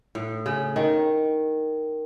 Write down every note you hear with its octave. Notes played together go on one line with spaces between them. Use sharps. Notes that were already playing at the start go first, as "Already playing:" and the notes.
A2
C#3
D#3